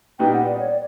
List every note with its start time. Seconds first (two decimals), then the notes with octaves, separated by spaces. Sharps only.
0.19 A#2 G3 B3 D#4 G5
0.33 F#5
0.46 D5
0.59 C#5
0.68 D5